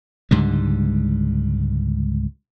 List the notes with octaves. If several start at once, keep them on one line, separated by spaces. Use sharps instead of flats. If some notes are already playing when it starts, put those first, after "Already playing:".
C#2 G#2 D3 G3